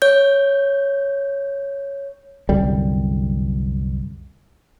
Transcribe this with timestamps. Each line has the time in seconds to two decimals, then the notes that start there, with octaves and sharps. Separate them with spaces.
0.02 C#5 G6
2.49 C2 F#2 D3 G3